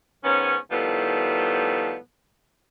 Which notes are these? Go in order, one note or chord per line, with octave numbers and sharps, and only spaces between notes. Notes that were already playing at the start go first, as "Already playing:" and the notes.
G#2 D#3 B3 C#4
A2 D#3 F3 G3 B3